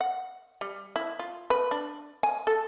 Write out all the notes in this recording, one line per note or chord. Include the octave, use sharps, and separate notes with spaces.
F#5
G3
E4
F4
B4
D4
G#5
A4